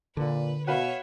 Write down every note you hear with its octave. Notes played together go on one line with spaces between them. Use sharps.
A#2 D3 B4
B2 F#4 B4 C#5 E5 F5